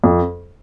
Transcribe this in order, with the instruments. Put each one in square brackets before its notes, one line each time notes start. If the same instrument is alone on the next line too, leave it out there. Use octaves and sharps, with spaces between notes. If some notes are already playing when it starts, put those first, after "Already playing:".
[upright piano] F2